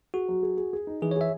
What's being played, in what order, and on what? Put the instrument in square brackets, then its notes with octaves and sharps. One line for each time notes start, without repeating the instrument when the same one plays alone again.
[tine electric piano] F#4 [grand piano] G#4
[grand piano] F#3
G#4
G#4
G#4
D#4
[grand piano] E3 [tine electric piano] G#4
[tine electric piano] C#5
[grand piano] G#4 [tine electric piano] E5